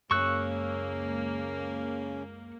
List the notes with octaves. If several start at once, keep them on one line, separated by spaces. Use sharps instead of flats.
C#2 F#2 C#3 A#3 C#4 C#6 E6 F#6